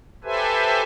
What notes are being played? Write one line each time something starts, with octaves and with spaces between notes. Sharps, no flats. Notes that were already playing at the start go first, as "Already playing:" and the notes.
G4 A4 B4 C5 E5 G#5